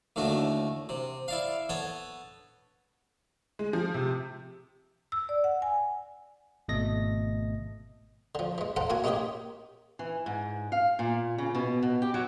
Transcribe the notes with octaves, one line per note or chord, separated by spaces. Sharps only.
D#2 A2 D3 A3 F#4
C3
E4 D5 F5
B3 A4 C#5 F#5
G#3
F3
C3
E6
D5
F#5
G#5
G#1 B2 A3 A4 D#5 A#6
D3 F3
E3 G#3
A4 C5 F5 F#5 A#5
A#3 E4 F#4 F5 G#5
G#3 A#3 C#4 D#4 G4 G#4
E3
G#2
F5
A#2
C#3
B2
B2
G4
F#3